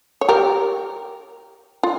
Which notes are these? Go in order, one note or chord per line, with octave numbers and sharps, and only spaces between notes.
C#5
G4 A#4
F4